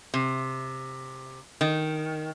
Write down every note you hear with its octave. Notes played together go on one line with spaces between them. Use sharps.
C3
D#3